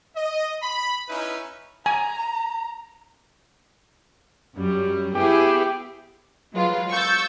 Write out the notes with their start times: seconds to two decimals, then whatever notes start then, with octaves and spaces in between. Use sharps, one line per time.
0.16 D#5
0.63 B5
1.09 C#4 D#4 E4 B4
1.86 G#5 A#5
4.55 F#2 G3
5.15 B3 E4 G4 G#4
6.53 F#3 G#3 F4 B4
6.89 C#6 E6 G6 A6